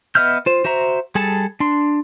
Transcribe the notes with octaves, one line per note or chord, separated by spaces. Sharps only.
B3 D#5 E5 F6 G6
F4 C5
F#4 C5 E5 A#5
G3 G#4 A4 A5
D4 C6